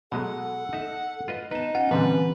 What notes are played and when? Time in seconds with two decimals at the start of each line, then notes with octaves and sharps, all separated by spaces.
0.12 B2 F#3 G#3 A4 F#5
0.73 D#4 E5
1.28 F4 B4 D#5
1.51 B3 D#4 B4 A5
1.75 C#4 F4 F#5
1.91 A#2 D3 E3 G3 C4 B4